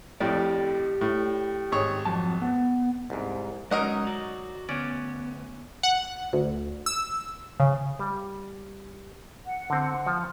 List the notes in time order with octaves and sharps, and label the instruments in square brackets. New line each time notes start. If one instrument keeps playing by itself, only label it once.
[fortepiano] F2 A2 [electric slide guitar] G4 D5
[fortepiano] A2
G#1 G#4 C#5
[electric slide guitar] F2 F#3 A5
B3
[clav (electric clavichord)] C2 G#2
[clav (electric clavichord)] F#3 D#4 [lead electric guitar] G#3 C#4 [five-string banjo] A#4 D#5 F#5
[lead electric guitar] F#4 D5
[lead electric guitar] D2 B3 [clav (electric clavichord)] C#4 D5
[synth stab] F#5
D2
E6
C#3
[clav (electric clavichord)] G3
[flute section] F#5
[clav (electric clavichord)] D3 C4
F3